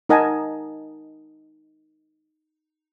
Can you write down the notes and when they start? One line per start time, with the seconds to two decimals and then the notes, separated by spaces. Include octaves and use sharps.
0.09 D#4 A#4 D#5 F#5 G#5 A5